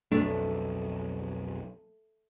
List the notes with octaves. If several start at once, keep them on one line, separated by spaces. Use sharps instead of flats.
B1 F2 A3 D4